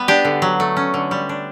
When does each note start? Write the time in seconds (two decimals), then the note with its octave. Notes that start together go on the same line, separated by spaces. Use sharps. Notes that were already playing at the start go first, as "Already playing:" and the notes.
Already playing: G3 B3 B4
0.08 D4 G4
0.25 D3
0.42 F#3
0.60 A3
0.77 C#4
0.94 D3
1.11 G3
1.29 D4